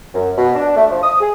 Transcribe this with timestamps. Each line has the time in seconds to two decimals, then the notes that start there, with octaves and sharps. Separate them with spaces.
0.15 F#2
0.37 B2
0.55 D4
0.76 A3
0.90 F3
1.03 D#6
1.20 G#4